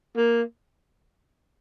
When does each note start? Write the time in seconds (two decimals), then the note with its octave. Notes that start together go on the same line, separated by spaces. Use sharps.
0.16 A#3